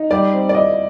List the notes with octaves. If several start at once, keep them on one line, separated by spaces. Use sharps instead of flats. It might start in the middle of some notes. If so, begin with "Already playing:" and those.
Already playing: D#4
G3 D5
C4
D5
E4 D#5